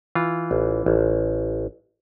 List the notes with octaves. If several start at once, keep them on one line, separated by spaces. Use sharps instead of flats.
E3 F4
A1
A1